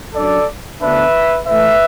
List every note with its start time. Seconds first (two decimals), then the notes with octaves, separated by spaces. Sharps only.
0.14 F#2 F#3 D4 A4 D5
0.81 D2 D3 B3 D4 B4 E5
1.47 A2 E3 A3 B4 E5